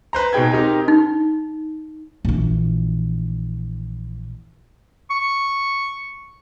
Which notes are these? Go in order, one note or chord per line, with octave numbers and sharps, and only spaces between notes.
B4 C5 A#5
B2 D#4 G#4 G5 G#6
C4 D#4 G4 A#4 D#5
D#4
A#1 E3
C#6